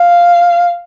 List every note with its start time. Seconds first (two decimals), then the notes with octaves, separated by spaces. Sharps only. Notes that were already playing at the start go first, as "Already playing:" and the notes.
Already playing: F5